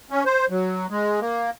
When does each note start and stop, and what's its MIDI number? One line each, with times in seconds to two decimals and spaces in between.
0.11 0.24 61
0.26 0.46 72
0.50 0.86 54
0.90 1.20 56
1.21 1.50 58